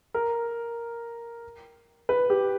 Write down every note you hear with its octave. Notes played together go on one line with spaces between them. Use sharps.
A#4
B4
G4